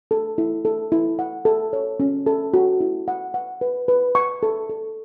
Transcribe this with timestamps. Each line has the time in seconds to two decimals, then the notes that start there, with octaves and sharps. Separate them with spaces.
0.11 A4
0.38 E4
0.65 A4
0.92 E4
1.19 F#5
1.45 A4
1.73 C#5
2.00 C#4
2.26 A4
2.54 F#4
2.81 E4
3.08 F#5
3.34 F#5
3.61 B4
3.88 B4
4.15 C#6
4.43 A4
4.69 A4